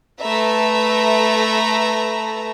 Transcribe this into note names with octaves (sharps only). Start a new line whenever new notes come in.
A3 A4 B4 E5 A#5